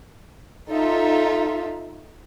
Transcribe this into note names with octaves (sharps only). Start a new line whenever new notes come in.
D#4 F4 A4 E5